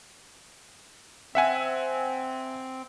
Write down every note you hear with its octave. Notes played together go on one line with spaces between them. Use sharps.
C4 E5 F#5 G#5